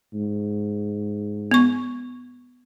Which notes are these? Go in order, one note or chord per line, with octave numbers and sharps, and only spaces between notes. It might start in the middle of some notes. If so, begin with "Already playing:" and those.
G#2
B3 C#6